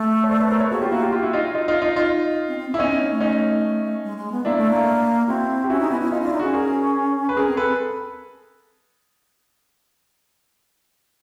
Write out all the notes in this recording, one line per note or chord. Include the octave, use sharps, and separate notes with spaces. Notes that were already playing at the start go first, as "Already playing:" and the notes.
Already playing: A3
C#5
C5 D5
B4 C#5
A#4 C5
B4 C#5
A#3 F#4 G#4
B3 F4 G4
A#3 E4 F#4
F4 G4
F4 G4
E4 F#4
D#4 F4
D#4 F4
D#4 F4
D#4 F4
D#4 F4
C4
C4
B3
E4
B3 C#4 D#4
C4
A#3
A3
C#4 D#4
G#3
G#3
B3
A#3 D4 E4
A3
A#3
C4 E4 F#4
G4
C#4 E4 F#4
D#4
B3 C#4 E4
E4
C#4 D#4 F4
D4 E4 F4
D#4
C#4 F#4 G#4
G#4 A#4
B4
C#4 G#4 A#4
C4
C4 A4 B4